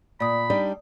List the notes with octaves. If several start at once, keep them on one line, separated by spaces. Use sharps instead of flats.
A#2 D5 B5 D#6
G3 D4 D#4